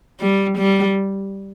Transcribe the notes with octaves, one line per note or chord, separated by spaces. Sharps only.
G3
G3